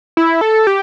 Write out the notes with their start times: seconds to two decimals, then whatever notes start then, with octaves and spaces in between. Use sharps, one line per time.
0.17 E4
0.41 A4
0.67 G4